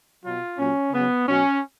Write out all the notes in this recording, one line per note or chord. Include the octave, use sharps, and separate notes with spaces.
B2 F#3 F4
A#2 F#3 C#4
C#3 F#3 B3
B2 F#3 C#4